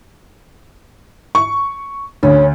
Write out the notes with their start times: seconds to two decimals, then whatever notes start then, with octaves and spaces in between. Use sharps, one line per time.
1.35 C#6
2.23 D2 C#4